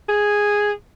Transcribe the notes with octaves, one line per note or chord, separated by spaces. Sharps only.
G#4